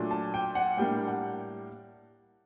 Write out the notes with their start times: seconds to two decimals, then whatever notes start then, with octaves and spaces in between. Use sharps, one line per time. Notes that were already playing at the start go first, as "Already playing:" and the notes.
Already playing: A#2 F#3 A3 D4
0.11 A5
0.34 G5
0.55 F#5
0.77 A2 G3 A#3 D4 G5
1.08 F#5